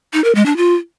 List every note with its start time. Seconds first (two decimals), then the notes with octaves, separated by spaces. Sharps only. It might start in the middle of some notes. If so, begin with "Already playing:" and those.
0.13 D#4
0.24 A#4
0.35 G#3
0.46 D4
0.57 F4